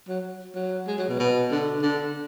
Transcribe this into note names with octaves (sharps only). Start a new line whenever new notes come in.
F#3
F#3
G#3
F#3
B2
B2
D3
D3